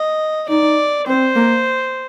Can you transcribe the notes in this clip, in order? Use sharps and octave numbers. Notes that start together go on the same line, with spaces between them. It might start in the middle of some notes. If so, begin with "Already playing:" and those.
Already playing: D#5
D#4 D5
C4 C5
A#3